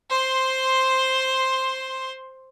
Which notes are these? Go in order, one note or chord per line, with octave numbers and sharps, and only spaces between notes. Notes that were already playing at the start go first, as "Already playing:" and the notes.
C5 C6